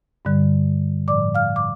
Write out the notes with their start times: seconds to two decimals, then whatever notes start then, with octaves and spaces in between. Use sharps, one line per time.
0.25 G2 D3 G3
1.08 A2 F3 D5 D6
1.35 F5 F6
1.56 D6